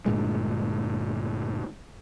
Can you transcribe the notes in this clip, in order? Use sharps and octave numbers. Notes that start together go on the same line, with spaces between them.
D2 G2 A#2 G#3